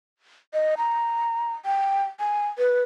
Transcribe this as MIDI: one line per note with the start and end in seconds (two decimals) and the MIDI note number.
0.54 0.75 75
0.77 1.54 82
1.65 2.04 79
2.20 2.47 80
2.58 2.82 71